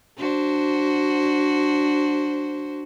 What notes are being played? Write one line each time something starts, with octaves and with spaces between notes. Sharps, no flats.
D4 F#4 C5